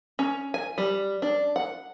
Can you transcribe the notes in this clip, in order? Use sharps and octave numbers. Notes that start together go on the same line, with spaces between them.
C#4
G#5
G3
D4
F#5